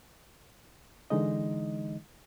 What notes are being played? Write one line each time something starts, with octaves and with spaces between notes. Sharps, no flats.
D3 E3 G#3 D#4 D#5